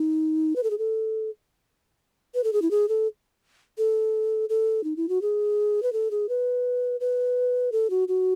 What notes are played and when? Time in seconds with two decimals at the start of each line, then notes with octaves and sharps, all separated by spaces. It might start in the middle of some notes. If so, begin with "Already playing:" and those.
Already playing: D#4
0.56 B4
0.63 A4
0.71 G#4
0.78 A4
2.35 B4
2.44 A4
2.53 G#4
2.62 E4
2.71 G#4
2.89 A4
3.78 A4
4.49 A4
4.84 D#4
4.97 E4
5.09 F#4
5.22 G#4
5.83 B4
5.93 A4
6.11 G#4
6.29 B4
7.00 B4
7.72 A4
7.90 F#4
8.08 F#4